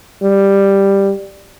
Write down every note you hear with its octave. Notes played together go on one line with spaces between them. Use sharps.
G3